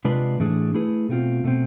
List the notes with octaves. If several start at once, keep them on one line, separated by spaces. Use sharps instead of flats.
C3 G#3 D4 F4 B4
A2 E3 A3 D4 G#4
A3 E4 G#4 B4
B2 A3 C4 F4
B2 A3 C4